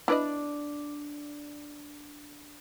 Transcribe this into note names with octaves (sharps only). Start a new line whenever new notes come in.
D4 E4 B4 D5 D#5